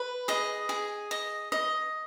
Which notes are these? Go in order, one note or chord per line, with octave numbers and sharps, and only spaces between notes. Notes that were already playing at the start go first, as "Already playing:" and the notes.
Already playing: B4
G#4 D#5
G#4
D#5
D#5